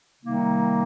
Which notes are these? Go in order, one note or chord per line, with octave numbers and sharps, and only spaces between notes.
C3 D#3 G3 A#3 D#4